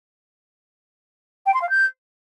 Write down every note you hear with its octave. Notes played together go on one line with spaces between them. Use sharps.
G5
C6
F5
G6